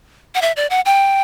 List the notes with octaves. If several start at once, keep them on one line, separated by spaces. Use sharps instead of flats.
F#5
E5
D5
F#5
G5